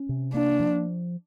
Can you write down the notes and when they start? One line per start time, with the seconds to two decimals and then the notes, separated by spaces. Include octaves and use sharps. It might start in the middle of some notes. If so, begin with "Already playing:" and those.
Already playing: C#4
0.09 C3
0.34 A#3 D4
0.60 F3